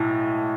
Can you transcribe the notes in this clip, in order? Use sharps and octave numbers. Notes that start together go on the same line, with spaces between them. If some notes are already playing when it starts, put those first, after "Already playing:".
Already playing: B1 A2 A3